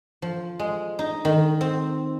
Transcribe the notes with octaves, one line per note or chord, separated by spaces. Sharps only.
F3
G#3
D#4
D#3
C4